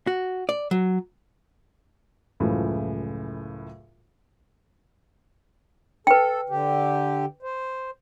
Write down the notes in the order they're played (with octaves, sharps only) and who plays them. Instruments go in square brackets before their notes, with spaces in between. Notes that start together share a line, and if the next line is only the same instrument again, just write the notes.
[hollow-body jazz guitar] F#4
D5
F#3
[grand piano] C#2 F#2 A2 C#3 E3 F3
[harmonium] A4 [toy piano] B4 G5
[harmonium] D3 G4
C5